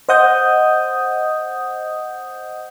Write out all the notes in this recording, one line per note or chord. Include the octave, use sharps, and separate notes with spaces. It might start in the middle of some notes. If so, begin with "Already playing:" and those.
C5 D#5 F#5 D#6 G6